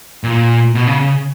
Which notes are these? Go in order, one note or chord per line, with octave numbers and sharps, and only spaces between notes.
A#2
B2
C#3
C#3